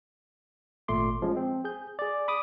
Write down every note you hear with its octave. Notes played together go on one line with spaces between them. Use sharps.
G#1 A#2 A3 C6 D6
F3 G#3 C#4
C4
G#4 G6
G#4 D5
B5 D6 D#6